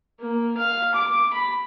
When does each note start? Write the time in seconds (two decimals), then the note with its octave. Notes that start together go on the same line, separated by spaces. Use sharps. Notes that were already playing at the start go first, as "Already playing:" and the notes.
0.19 A#3
0.57 F5
0.94 D6
1.33 B5